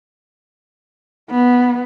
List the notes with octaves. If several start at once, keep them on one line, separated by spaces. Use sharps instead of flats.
B3